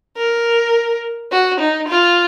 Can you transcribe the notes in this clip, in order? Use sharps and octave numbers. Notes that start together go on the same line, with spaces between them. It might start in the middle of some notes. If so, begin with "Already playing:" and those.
A#4
F#4
D#4
F4